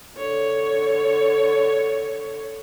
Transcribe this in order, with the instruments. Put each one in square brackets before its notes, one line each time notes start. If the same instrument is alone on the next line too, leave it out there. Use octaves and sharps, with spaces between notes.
[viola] D3 C#5